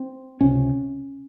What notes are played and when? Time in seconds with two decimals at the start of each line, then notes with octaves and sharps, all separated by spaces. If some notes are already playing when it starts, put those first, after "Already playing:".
Already playing: C4
0.41 C#2 C3 C#4